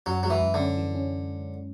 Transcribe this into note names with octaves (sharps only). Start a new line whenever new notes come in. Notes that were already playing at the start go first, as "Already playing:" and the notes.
F#2 F#3
F#3 G#3
E3
F#2
D3 C#4
E3
C#4